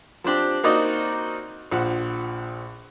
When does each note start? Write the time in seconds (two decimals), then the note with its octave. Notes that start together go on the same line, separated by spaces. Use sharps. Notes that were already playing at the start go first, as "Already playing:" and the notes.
0.24 F3 C4 D4 G4
0.64 A#3 C4 D#4 F#4 D5 D#5
1.72 A#1 F3 F#5